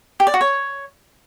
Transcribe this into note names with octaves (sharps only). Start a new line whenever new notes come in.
G4
D5
F#4
C#5